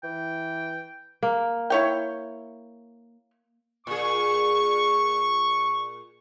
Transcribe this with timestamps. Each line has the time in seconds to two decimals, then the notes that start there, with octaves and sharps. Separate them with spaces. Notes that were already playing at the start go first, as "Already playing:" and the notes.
0.04 E3 G5
1.23 A#3
1.70 E4 C#5 G5
3.87 A#2 G#4 C#6